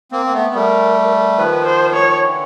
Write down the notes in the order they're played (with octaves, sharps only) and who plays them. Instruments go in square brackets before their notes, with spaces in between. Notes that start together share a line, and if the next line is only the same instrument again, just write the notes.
[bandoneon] A#3 C4
A#3
A3 B3
[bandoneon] G3 A3 [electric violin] A#4
[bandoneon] D#3 F3 [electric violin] B4
[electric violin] C5
C#5
[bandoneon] D3 E3